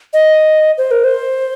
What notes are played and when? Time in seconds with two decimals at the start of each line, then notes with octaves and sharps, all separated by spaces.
0.13 D#5
0.78 C5
0.91 A#4
1.04 C5